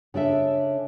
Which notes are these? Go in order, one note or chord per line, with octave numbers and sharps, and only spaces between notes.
C#3 D4 A4 E5